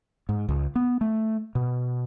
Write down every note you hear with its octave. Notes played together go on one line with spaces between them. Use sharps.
G#2
C#2
B3
A3
B2